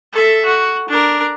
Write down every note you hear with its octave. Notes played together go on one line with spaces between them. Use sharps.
A4 E5
F#4
D4 A#4